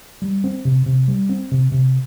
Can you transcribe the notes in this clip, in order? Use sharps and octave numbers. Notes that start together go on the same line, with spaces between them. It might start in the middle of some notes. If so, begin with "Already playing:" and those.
G3
C4
C3
C3
G3
C4
C3
C3